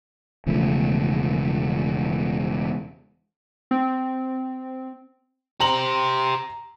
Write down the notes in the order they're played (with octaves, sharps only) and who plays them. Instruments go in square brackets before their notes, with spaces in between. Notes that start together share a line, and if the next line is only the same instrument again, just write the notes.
[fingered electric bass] E1 C#3 F3 A3
[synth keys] C4
[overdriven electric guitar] G4 C5 [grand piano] A#5 F#7